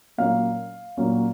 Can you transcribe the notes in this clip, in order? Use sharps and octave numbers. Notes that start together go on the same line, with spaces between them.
A#2 F#3 A#3 C#4 F5
A#2 F#3 A#3 C#4